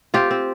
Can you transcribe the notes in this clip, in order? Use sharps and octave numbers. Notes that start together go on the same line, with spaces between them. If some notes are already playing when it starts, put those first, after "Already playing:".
C4 F4 G4
C4